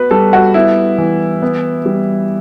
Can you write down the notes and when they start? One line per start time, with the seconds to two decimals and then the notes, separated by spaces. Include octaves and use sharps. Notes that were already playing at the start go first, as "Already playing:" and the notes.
Already playing: B3 F#4 B4
0.11 G3 A4
0.33 F#4
0.54 B3 E4
0.98 E3
1.42 B3
1.86 G3